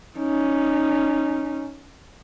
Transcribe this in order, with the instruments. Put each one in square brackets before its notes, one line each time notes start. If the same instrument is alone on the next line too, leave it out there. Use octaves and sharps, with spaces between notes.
[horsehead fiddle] C#4 D#4